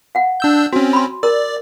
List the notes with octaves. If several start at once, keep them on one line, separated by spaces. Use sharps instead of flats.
F5 F#5
D4 E6 G6
C4 C#4 F#4
B5 C6
A#4 D5 E6